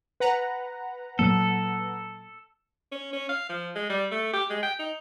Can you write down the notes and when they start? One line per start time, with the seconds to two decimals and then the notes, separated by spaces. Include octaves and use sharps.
0.20 B4 F#5 A#5
1.19 A#2 F#3 A#3 A4
2.92 C#4
3.13 C#4
3.29 F5
3.49 F3
3.76 G#3
3.89 G3
4.11 A3
4.33 G4
4.50 G#3
4.63 G5
4.79 D#4